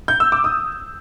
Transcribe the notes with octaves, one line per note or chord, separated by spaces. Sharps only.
G6
E6
D6
D#6